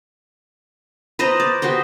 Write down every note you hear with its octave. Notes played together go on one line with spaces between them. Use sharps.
B4 C5 D#5 A#5
D5
F#4 G4 C5 D#5